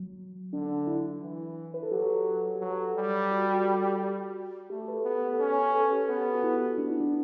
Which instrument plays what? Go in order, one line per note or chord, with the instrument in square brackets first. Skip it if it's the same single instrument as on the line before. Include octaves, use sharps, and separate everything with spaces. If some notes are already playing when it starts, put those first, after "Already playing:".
Already playing: [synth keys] F#3
[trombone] D3 [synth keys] D4
[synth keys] E4
[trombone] E3
[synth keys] B4
A4
[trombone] F#3 [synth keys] G4
[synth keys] G4
[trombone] F#3 [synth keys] A4
[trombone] G3
[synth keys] F#4
G4
F#4
[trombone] A3 [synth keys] G4
[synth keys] B4
A4
[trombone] B3
[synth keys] A4
[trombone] C#4 [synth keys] B4
[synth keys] B4
A4
G4
[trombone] B3 [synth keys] A4
[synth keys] F#4
E4
[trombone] B3 [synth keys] D4
[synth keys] E4
D4